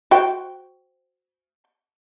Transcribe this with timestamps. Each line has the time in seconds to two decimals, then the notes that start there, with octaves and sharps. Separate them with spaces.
0.11 F#4 C5 G5